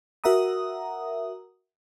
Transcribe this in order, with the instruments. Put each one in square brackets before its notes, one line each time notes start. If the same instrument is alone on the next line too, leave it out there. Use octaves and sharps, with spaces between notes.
[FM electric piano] F#4 A#4 E5 F#5 A#5 D#6